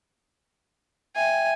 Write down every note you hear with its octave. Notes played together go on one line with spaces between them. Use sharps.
E5 G5 G#5